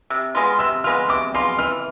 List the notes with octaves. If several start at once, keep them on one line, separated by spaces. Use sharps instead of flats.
C3
G#3 B3 F4
C3 E6
G#3 B3 F4 F6
C3 D6
G#3 B3 F4 C6
E3 F6